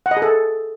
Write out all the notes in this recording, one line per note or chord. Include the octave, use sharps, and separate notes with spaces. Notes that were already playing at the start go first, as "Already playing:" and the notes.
F#5
D#5
G#4
A4